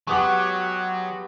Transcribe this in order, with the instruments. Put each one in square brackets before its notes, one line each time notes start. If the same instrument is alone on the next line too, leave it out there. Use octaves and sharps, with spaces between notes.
[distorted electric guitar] F#3 [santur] G#3 B3 G4 [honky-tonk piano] C#6 D6